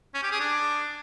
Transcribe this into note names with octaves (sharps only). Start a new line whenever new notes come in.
C#4
G4
G#4
D4